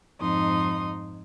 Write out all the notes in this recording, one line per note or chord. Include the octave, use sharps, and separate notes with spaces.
F2 G#2 D#4 C6 D#6